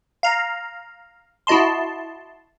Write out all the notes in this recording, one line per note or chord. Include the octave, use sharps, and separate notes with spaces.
F5 A#5
E4 F#4 D#5 A5 C6